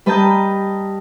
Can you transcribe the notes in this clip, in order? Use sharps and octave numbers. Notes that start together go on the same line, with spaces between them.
G3 B4 D#5 A5 A#5 G6